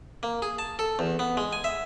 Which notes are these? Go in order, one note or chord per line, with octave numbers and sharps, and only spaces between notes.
A#3
G#4
A5
A4
E2
B3
G#3
G#5
E5